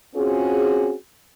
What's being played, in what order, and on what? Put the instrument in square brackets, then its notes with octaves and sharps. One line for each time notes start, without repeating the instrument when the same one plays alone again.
[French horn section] C4 C#4 F4 F#4 G#4